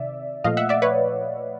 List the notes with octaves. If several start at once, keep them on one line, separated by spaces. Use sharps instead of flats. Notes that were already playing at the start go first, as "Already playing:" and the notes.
Already playing: C3 D#3 D5 E5
A#2 F3 A3 D#5 F5
E5 F#5
D5 E5
B4 C#5